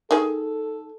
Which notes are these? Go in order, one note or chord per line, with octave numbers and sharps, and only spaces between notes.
D#3 G#4 A4